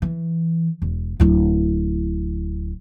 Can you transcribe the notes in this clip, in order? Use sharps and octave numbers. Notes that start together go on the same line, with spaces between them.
E3
E1
D1 E4